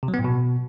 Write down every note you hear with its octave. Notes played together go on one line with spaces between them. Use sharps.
C3
F#3
B3
A2
B2